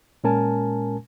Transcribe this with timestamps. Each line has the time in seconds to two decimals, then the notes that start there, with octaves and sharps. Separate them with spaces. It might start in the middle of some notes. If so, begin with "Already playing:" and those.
0.24 A#2 G#3 C#4 A#4 G#5 A5